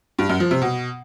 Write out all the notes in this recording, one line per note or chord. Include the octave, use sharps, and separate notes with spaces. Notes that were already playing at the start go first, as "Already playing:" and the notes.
G2
F#2
F3
C3
B2